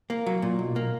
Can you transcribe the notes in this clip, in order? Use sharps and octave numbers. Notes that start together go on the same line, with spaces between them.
A#3
F#3
A#2
B1
A#3